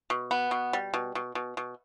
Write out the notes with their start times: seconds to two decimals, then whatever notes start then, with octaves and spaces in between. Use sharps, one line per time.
0.10 B2
0.31 B3
0.51 B2
0.73 G3
0.94 B2
1.15 B2
1.35 B2
1.57 B2